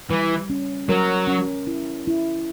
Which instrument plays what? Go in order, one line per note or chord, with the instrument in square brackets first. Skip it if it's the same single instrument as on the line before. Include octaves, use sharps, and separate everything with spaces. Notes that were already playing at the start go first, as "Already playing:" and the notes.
[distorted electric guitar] E3 [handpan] G3
[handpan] C#4
[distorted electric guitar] F#3 [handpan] A#4
[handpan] C#4
E4
E4